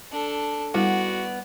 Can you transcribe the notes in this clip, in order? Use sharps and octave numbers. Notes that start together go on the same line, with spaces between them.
D4 A4
G3 B3 E4 F#4 D5